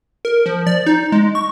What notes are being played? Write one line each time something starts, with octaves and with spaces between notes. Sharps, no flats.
A#4
F3
D5
D#4
G#3
C#6